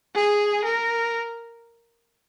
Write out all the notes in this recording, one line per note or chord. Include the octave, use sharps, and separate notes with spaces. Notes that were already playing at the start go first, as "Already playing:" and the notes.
G#4
A#4